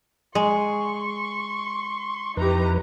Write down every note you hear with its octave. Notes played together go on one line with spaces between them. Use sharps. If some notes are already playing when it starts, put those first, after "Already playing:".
G#3 C6 C#6
F2 D#4 E4 G4 B4 A#5